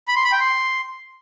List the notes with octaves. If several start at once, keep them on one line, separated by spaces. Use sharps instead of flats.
B5
C6
B5
G5
C6